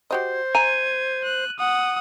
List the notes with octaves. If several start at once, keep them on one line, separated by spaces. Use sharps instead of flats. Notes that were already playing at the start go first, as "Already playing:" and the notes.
F#4 G4 C5 D#5
E5 G#5 A#5 G#6 D#7
F#6
F#5 D#6